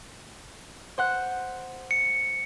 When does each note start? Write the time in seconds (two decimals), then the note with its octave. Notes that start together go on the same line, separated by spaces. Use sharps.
0.98 C5 F#5 F#6
1.91 C#7